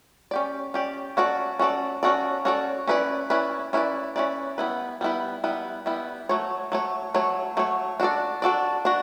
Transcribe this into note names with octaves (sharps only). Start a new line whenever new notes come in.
C#4 G4 D5
C#4 G4 D5
C#4 F#4 A4 D5
C#4 F#4 A4 D5
C#4 F#4 A4 D5
C#4 F#4 A4 D5
C#4 E4 B4 D5
C#4 E4 B4 D5
C#4 E4 B4 D5
C#4 E4 B4 D5
G3 B3 E4 B4
G3 B3 E4 B4
G3 B3 E4 B4
G3 B3 E4 B4
F#3 A3 C#5
F#3 A3 C#5
F#3 A3 C#5
F#3 A3 C#5
D4 F#4 A4 D5
D4 F#4 A4 D5
D4 F#4